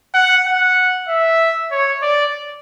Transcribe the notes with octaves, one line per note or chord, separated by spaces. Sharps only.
F#5
F#5
E5
C#5
D5